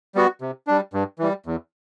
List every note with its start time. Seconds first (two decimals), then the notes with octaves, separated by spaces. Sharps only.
0.15 G3 B3 F#4
0.41 C3
0.67 G3 D4
0.93 G2
1.19 E3 G3
1.46 E2